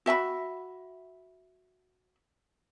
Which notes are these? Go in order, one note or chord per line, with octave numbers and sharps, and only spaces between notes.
F#4 E5 G5 B5